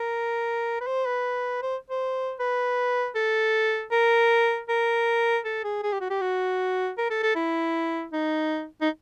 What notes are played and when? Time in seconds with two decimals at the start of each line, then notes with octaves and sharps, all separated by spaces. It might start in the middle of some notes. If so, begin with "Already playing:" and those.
Already playing: A#4
0.81 B4
0.87 C5
1.06 B4
1.62 C5
1.90 C5
2.40 B4
3.15 A4
3.92 A#4
4.69 A#4
5.45 A4
5.64 G#4
5.83 G#4
5.92 G4
6.01 F#4
6.10 G4
6.21 F#4
6.98 A#4
7.10 A4
7.23 A4
7.35 E4
8.13 D#4
8.81 D#4